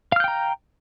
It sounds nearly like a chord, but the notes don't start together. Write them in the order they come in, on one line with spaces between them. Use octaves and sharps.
F5 F6 G6 G5 A#5